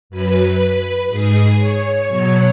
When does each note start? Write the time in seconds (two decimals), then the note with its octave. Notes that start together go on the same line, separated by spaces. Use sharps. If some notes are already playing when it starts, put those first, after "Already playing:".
0.10 F#2 F#3 B4
1.09 G#2 G#3 G#4
1.58 C#5
2.08 B2 F#3